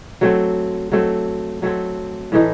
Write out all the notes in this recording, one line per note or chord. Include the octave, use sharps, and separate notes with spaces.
F#3 A3 C4
F#3 A3 C4
F#3 A3 C4
A2 E3 A3 D#4